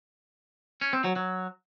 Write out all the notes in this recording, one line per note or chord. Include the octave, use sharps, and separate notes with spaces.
C#4
C4
F#3
F#3